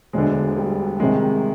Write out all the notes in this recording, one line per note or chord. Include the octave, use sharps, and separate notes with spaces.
E1 D2 D3 G#3
G3
C2 C3 D#3 G#3